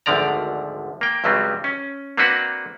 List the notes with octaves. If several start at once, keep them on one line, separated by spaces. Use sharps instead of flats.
G#1 D2 D3 F3 D5 A#5
A#3 G5
C#2 G2 F#3 G3 C4
C#4
A#3 C4 D4 F#4 B4 F#5